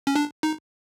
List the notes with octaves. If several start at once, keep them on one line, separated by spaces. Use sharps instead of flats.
C#4
D4
D#4